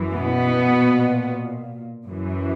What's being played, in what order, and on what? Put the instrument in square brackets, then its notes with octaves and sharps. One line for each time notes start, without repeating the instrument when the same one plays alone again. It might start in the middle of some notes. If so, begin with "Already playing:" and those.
Already playing: [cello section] F#2 E3
B2 B3
A#2
F#2 E3